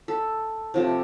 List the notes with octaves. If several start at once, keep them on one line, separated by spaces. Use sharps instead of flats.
A4
C3 F3 A3